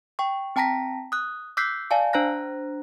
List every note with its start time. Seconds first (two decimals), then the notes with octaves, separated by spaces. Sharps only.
0.19 G5 C#6
0.56 C4 G5 A5 A#5 A#6 B6
1.12 D#6 F#6
1.57 D6 E6 F#6 G6 B6 C7
1.91 D5 F5 G#5 A5
2.13 D4 C5 A#5 F#6 A#6